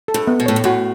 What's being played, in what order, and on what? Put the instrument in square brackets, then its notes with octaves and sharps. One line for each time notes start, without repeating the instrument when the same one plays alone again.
[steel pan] A4
[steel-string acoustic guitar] G2
[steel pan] B3
[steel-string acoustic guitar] B2
[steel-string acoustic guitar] A2 [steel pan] C#5
[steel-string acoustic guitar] G2
[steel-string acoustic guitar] A2 [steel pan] F#4